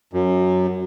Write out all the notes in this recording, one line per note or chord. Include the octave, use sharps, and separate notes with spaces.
F#2